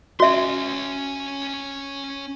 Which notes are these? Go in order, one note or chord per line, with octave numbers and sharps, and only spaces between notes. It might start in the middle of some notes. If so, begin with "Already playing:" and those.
C#4 F#4 E5 C6